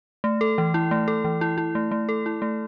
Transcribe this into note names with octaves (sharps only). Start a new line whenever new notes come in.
A3
A4
E3
E4
A3
A4
E3
E4
E4
A3
A3
A4
E4
A3